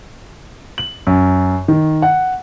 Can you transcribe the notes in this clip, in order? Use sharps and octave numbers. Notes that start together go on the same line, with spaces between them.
F#7
F#2
D#3
F#5